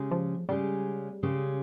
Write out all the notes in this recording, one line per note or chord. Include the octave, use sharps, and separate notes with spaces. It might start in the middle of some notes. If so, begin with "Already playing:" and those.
Already playing: C#3 G#3 C#4 G4
F3
C#3 G3 G#3 C#4 G4
C#3 G#3 C#4 G4